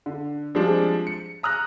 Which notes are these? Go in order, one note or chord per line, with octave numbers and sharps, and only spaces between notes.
D3
F3 G3 G#3 C4 D4
C#7
A#5 D#6 F6 F#6 A#6